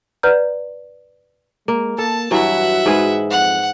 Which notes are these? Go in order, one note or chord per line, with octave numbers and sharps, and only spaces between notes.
B4 D5 F#5 A#5 F6 G6
G#3 A#3
A#3 A4 A5
G2 E3 F#3 F#4 E5 F#5
G#2 G#4 B4
F2 F#5